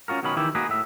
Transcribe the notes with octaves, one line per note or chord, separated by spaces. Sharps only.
C#4 F4 F#4 A#4
B2 D#3 F#3 G#3 C#4 B5
D#3 E3 E4 G4
A#3 D#4 F#4 G#4 A#4 B4
A2 E5